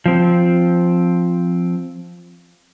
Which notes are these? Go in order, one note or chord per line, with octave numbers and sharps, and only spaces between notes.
F3 C4